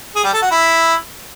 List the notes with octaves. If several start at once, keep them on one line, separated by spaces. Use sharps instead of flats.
G#4
G3
A4
F#4
E4